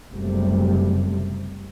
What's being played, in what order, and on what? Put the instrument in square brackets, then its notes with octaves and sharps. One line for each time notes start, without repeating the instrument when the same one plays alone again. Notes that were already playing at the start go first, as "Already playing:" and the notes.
[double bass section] F#1 C3 G3 A3